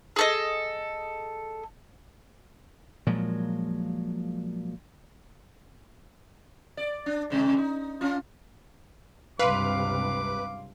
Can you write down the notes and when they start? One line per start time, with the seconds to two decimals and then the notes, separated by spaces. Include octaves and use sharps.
0.16 G#4 A4 D#5
3.06 A#2 F3 F#3 G#3
6.77 D5
7.06 D4
7.30 G#2 C3 G#3
7.58 D#4
8.01 C#4 F4
9.39 C#2 G2 C3 B4 F5 C6 D6